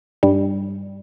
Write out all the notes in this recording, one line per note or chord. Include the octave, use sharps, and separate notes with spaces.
G2 G3